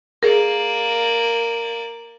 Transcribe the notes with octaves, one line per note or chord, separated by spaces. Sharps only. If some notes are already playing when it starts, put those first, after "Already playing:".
A#3 G#4 A#4 D5